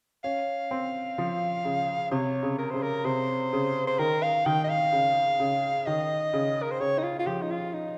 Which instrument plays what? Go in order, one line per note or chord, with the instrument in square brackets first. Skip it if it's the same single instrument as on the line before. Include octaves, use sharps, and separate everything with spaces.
[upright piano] C#4 [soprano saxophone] F5
[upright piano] C4
F3
C#3
[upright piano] C3 [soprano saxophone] C#5
[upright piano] C#3
[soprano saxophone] A#4
[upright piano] C#3 [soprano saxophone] C5
[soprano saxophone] A#4
[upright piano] C3 [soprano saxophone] C5
[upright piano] C#3
[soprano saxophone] C5
[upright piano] D#3 [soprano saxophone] A#4
[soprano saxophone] F5
[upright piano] D#3 [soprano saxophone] G5
[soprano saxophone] D#5
F5
[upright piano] C#3
C#3
[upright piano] D#3 [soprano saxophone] D#5
[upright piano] C#3
[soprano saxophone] A#4
C5
[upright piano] C#3 [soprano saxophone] C#5
[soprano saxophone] D#4
F4
F4
[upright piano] F3 [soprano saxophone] G4
[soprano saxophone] D#4
F4
D#4